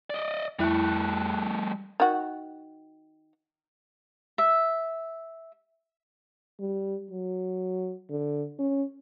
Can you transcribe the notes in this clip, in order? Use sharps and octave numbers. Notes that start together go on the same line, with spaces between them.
D5 D#5
F2 G3 A3 E4 F#6
D#3 F#4
E5
G3
F#3
D3
C#4